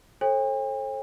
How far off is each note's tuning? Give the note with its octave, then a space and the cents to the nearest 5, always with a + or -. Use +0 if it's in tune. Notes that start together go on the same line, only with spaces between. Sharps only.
A4 -10 C5 +45 G5 +45